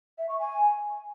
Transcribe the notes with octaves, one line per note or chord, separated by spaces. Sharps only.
E5
C#6
G#5